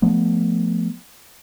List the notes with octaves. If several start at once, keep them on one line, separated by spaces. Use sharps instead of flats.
F3 A3 B3